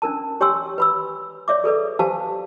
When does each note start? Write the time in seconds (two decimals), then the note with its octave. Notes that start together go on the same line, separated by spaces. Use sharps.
0.02 C#4 D4 A#4 A5
0.40 G4 C#5 G5 G#5 C6 E6
0.78 B4 B5 E6
1.48 C#5 D5 E5 D6
1.64 G#4 A4 B4 D5
1.99 G4 B4 C5 F5 G#5 A5